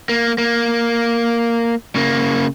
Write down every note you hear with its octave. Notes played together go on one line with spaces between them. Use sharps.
A#3
A#3
C#3 A#3